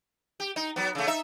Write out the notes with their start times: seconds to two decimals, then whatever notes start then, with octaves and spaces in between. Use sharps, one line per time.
0.40 G4
0.56 D#4
0.76 F#3 B3
0.95 C#3 A3
1.07 D#4 E5